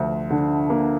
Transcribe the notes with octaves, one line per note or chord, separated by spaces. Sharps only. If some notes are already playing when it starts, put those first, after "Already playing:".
Already playing: D2 F3
D3
A#3